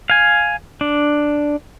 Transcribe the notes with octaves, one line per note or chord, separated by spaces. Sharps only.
F5 G#5
D4